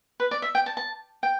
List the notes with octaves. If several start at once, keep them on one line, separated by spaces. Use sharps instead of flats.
B4
D5
E5
G5
A5
A5
G5